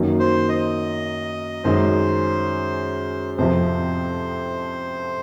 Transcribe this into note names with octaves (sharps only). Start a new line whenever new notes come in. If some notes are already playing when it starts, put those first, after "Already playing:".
Already playing: F#2 D#3 F#3 A#3
C5
D#5
F#2 D#3 G#3 C#4 C5
F2 C3 F3 C5